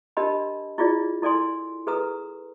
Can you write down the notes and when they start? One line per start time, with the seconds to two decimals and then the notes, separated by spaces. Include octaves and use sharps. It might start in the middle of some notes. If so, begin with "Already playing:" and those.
0.17 D4 G4 A#4 D#5 A5 B5
0.78 E4 F4 G#4 D5
1.22 E4 A4 D5 G#5 C6
1.87 G#4 A4 B4 A#5 D#6